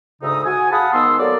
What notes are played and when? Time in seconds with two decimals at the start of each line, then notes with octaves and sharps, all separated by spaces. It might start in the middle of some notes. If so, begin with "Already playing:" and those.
0.22 D2 G#2 C#3 D#4 E5 D#6
0.46 F#4 G#5
0.71 G#4 F5 F#5 A5 B5 D#6
0.93 G#2 D#3 B3 C6 E6
1.19 F#3 A#3 A4 D5